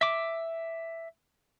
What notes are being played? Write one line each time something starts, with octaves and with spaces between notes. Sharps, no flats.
E5 D6